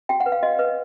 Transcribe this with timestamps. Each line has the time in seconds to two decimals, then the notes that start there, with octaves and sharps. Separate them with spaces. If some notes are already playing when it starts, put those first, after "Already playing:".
0.09 F#4 G5
0.20 F#5
0.26 B4
0.32 F5
0.43 F#4 D#5
0.59 B4